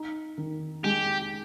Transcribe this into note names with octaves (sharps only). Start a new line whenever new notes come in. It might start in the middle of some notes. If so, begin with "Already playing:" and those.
Already playing: D#4
D#3
G#3 G4